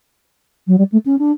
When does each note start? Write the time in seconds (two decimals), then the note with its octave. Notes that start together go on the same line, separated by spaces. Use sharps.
0.67 F#3
0.78 G3
0.92 A3
1.06 C#4
1.19 D4